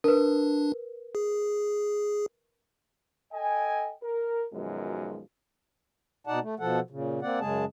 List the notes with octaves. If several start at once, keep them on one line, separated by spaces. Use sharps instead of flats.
D4 A#4 B4
G#4
A4 D#5 G5 G#5
A#4
B1 F#2 B2 D#3 F3 G#3
B2 D#4 D5 F#5 A5
A3
B2 F3 A4 F#5
A#2 C#3
A#3 C4 D5 F#5
F#2 C#3 G#3 G#4 A5